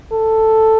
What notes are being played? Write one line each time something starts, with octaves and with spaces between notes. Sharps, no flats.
A4